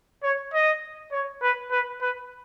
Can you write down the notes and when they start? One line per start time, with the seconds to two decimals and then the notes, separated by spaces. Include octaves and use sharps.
0.23 C#5
0.53 D#5
1.12 C#5
1.42 B4
1.71 B4
2.02 B4